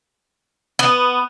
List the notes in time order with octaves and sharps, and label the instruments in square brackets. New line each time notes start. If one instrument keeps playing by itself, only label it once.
[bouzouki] B3